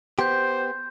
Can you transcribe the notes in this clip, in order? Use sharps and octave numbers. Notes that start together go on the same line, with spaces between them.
B3 G4 C5 C6 G6